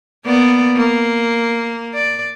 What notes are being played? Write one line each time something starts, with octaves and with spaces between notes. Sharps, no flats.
A#3 B3 D5
A#3
D5